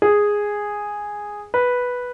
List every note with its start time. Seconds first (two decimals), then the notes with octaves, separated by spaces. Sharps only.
0.02 G#4
1.54 B4